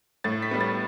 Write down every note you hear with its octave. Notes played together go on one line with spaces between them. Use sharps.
A2 A6
B6
G3 B3
A6